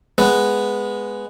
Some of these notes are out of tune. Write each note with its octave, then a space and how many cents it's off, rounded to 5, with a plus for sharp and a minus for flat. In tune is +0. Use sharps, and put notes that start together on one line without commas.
G#3 +0 B3 +0